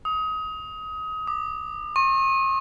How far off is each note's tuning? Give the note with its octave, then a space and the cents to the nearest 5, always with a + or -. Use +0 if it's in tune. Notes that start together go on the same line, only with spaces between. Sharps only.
D#6 +25
D6 +40
C#6 -45